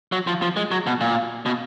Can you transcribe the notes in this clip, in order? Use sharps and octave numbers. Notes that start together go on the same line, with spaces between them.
F#3
F3
F3
G#3
F#3
B2
A#2
B2